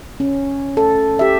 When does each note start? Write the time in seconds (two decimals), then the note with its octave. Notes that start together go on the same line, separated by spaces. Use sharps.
0.20 C#4
0.77 A4
1.19 G4 E5